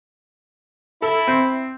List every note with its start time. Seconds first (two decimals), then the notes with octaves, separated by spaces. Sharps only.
1.02 E4 A4
1.28 C4